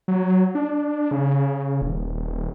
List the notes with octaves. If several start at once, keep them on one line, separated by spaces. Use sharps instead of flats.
F#3
D4
C#3
D#1